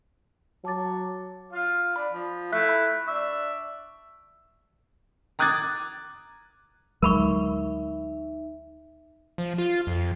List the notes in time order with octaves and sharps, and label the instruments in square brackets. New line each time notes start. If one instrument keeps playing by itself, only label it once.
[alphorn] F#3 [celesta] A5 D6 A6
[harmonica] F4 F5
[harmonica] D4 [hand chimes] B5
[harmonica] F3
[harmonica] A3 E4 [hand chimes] E5 F#6 B6
[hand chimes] B5
[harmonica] D4 E5 [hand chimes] C#6
[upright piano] A#5 D6 D#6 F#6 G#6 A6
[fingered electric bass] D2 F#3 G#3 [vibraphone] D#4 E5 [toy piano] A#4 B5 C#6
[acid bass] F3
F4
F2